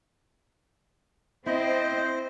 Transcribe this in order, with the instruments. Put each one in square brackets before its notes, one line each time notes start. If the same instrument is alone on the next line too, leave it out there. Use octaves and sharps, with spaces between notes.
[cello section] C4 [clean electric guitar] E4 [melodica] C5 [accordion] D#5